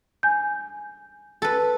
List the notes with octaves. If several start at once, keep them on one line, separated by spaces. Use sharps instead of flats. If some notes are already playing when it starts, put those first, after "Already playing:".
G#5 G6
A4 B4